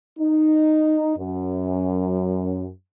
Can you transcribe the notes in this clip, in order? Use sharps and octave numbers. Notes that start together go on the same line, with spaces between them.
D#4
F#2